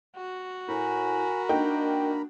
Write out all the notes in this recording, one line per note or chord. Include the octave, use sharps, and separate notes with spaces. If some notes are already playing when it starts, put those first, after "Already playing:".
F#4
A2 A#4 G#5 B5
A#3 D4 D#4 G5